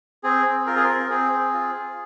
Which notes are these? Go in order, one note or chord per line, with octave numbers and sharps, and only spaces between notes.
C4 G#4
C4
F4 A#4
G#4
C4 A#4
C4 G#4
C4
F4
G#4